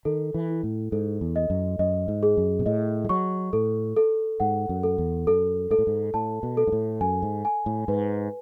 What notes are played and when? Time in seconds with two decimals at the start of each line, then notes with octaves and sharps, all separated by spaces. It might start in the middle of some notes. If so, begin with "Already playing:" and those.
0.05 D#3 A4
0.34 E3
0.49 E4
0.63 A2
0.92 G#2 A4
1.21 E2
1.36 D#5
1.50 F#2
1.79 F#2 D#5
2.08 G#2
2.23 G#4
2.37 F#2
2.59 B2
2.66 A2 D#5
3.05 G#3
3.09 F#3 C#6
3.53 A2 A4
3.97 A4
4.40 G#2 F#5
4.69 F#2
4.83 A4
4.98 E2
5.27 F#2 A4
5.71 G#2 A4
5.79 A2
5.87 G#2
6.14 A2 A5
6.43 B2
6.57 A4
6.67 G#2
6.72 A2
7.01 F#2 G#5
7.23 G#2
7.45 G#5
7.66 A2
7.88 G#2 B4